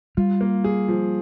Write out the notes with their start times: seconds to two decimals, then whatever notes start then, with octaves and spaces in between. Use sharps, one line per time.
0.17 G3 F4
0.41 A#3
0.64 G#4
0.88 F3